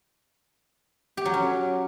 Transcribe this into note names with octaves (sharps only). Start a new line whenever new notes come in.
G4
F#3
C#4